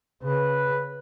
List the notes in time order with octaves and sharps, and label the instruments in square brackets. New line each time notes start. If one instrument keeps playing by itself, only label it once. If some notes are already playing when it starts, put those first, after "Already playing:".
[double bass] C#3 [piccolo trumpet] B4